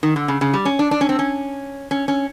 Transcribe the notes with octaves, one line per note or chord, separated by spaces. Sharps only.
D#3
D3
C#3
C#3
G3
C#4
D4
D4
C#4
C4
C#4
C#4
C#4